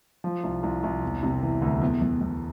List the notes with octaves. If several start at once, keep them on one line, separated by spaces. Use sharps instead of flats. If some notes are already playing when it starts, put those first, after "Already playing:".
F3
C2
C2
C2
E1
C3
E3
D2
E2
E2
E2